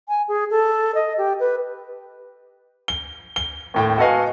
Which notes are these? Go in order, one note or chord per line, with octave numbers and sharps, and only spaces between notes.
G#5
G#4
A4
D#5
G4
B4
G7
G7
D#2 A2 G5
F#4 A4 B4 D#5 F5 G#5